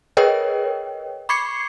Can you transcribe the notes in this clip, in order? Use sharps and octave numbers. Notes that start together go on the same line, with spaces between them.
G#4 A#4 B4 C#5 D#5 G5
B5 C#6 D6 G#6 C7 C#7